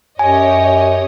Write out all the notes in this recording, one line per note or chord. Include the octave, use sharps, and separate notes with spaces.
F#2 G4 C#5 D#5 G#5